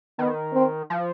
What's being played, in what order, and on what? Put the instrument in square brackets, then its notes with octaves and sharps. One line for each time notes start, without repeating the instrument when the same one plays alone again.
[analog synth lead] D#3 [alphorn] B3
[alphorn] C4
[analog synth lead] F3